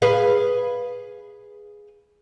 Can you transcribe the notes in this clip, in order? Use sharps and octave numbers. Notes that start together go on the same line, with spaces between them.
G#4 B4 F5